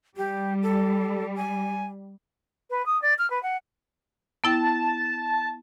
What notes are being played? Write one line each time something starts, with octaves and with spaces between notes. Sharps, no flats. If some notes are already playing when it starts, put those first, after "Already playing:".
G3 G4
A4
G#5
B4
D#6
D5
F6
B4
F#5
B3 E4 G5 A5